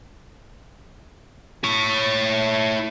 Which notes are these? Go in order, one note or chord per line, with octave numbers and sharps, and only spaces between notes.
E4 C#5